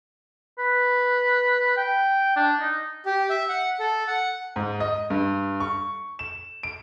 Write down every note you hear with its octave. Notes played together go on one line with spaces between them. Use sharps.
B4
G5
D4
D#4
G4
E5
F#5
A4
F#5
G#2
D#5
G2
C#6
E7
D7